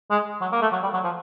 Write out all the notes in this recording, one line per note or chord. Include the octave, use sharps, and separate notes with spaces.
G#3
F#3
A#3
A3
F#3
G3
F#3
F3